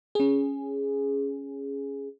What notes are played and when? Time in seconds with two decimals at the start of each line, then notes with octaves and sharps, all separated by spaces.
0.15 C#4 G#4